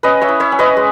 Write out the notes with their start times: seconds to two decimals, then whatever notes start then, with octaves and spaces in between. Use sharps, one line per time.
0.03 C#4 B4 D#5
0.21 C#5 E5
0.29 E4
0.40 C#5 E5
0.52 C#4
0.59 B4 D#5
0.77 G#3